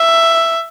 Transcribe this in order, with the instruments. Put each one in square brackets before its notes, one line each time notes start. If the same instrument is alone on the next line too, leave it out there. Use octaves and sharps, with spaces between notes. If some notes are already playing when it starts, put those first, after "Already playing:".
Already playing: [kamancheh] E5